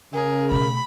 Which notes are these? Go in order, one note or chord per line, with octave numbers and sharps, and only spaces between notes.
C#3 G#4 A#4
B2 A3 B5